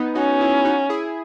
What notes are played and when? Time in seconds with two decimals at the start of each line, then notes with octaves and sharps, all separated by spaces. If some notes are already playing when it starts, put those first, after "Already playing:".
Already playing: B3 D#4
0.15 C#4 D#4 F#4
0.41 E4 G#4
0.65 D#4 F#4
0.89 E4 G#4